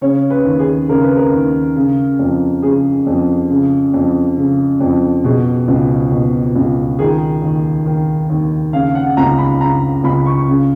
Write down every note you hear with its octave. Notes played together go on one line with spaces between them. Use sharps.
C#3 C#5
B4
D#2
G#4
C#3 A#4
B4
A#4
D#2
C#3
F2
C#3 G#4
F2
C#3
F2
C#3
F2
B2 G#4
C#2
B2
C#2
D#3 G#4
D#2
D#3
D#2
C#3 F5
F#5
C#2 A#5
B5
C#3 A#5
C#2 B5
C#6
C#3